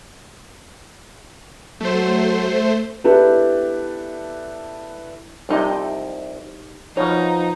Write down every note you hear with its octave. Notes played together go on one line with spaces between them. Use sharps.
F#3 A3 C5
B3 D4 E4 G4 A4 B4
C2 F2 C3 G3 D#4 D#5
B2 F3 D#4 C#5 F5 A#5